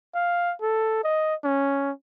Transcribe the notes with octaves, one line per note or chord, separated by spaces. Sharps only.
F5
A4
D#5
C#4